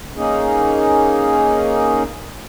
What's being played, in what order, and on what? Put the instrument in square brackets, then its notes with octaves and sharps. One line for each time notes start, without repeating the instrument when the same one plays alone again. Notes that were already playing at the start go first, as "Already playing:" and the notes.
[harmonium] A#3 C#4 D#4 G#4